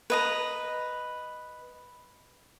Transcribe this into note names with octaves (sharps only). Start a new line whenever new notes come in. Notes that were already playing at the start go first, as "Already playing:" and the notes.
B4 D#5 A#5